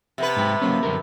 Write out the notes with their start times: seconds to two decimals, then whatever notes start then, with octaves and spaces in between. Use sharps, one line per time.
0.18 C3 B3 B4
0.37 G#2 G4
0.62 F#3 A#3 C#4
0.83 F#2 D3 A#4